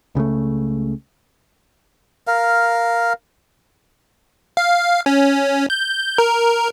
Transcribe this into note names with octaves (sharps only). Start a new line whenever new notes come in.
C#2 C#3 F3 A3
A#4 F5
F5
C#4
G6
A#4